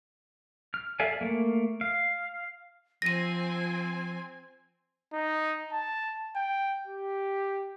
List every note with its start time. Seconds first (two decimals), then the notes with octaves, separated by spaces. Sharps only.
0.74 F6
1.00 A4 D5 E5 F5 G#5
1.21 A3 A#3
1.81 F5
3.02 F3 C4 G#5 A#6 D#7
5.13 D#4
5.72 A5
6.36 G5
6.87 G4